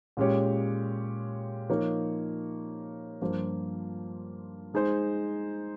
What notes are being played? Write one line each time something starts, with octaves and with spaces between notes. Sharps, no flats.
A#2 G#3 C#4 G4 C#5
F3 A#3 D#4 A#4 C#5
G2 F3 A#3 F4 C5
G#3 D#4 G#4 C5